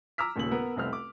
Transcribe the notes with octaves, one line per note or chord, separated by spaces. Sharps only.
A#5 D6 E6 F6 B6
D#1 D#2 C#3 F#7
B3 A#4 B4
F1 C2 C4 F6
D6